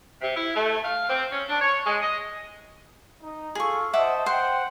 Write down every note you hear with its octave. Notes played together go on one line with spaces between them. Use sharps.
C3
E4
A3
F5
C4
C#4
D4
C#5
G#3
D#5
D#4
F4 G#4 A4 F5 C#6
C5 D#5 E5 F#5 A5 D6
C5 F#5 G5